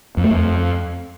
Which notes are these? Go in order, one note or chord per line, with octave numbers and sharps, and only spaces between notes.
F2
A3
F2